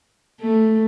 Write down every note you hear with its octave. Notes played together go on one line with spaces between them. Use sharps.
A3